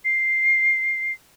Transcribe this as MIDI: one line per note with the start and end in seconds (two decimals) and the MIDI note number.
0.05 1.13 96